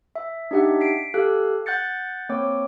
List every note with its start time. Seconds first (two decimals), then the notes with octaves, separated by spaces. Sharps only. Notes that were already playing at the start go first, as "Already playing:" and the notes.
0.15 E5
0.51 D4 D#4 G4 E5 F#5
0.81 B6 C7 D7
1.14 G4 A4 F5 F#6
1.66 F#5 F#6 G6 A6 C#7
2.29 A#3 C4 C#5 D6